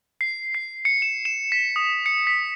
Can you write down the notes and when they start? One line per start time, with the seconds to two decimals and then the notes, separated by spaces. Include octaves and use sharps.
0.21 C7
0.55 C7
0.85 C#7
1.02 E7
1.25 E7
1.52 B6
1.76 D#6
2.06 C#7
2.27 B6